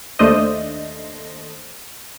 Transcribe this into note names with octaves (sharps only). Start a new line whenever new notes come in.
D#2 A3 D4 C5 D#5